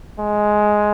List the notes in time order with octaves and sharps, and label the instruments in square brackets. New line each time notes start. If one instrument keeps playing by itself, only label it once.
[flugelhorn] G#3